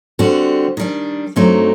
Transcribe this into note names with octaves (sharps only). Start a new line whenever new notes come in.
D3 G3 C4 F#4
D#3 G3 D4
G2 F#3 A3 C4 D#4